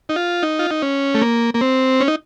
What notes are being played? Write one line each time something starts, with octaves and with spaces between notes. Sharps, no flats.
D#4
F4
D#4
F4
D#4
C#4
A3
A#3
A#3
C4
C#4
D#4